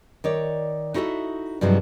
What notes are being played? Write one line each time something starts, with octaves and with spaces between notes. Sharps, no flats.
D#3 C#5 D5
D#4 E4 F#4 A4 D#5 E5
G2 C3 F3 F#3 G#3